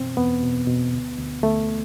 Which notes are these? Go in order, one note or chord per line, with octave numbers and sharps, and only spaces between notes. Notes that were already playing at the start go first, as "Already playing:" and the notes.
Already playing: F#2 B2 E3 C4
E2 B3
B2
B2
D2
D2
D2 A3